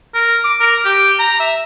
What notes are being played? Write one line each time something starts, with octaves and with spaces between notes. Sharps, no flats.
A#4
D6
A#4
G4
A#5
E5